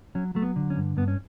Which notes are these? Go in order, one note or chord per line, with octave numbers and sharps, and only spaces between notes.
F#3 C#4
F#3 A3
B3
D3
C#4
G2
G2 B3
C#4